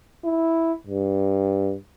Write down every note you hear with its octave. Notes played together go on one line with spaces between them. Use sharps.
E4
G2